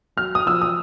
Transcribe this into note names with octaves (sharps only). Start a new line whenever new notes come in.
F#3 F6
D#6
F3 E6
D#6